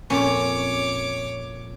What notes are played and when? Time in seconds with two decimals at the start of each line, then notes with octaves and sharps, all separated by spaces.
0.10 F2 A#2 C#4 C#5 D6